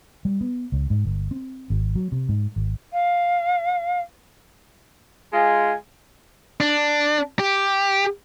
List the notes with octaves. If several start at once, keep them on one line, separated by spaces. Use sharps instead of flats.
G3
B3
C#2
G#2
G1
C4
G#1
F#3
C3
G#2
G#1
F5
G#3 F4 G#5
D4
G4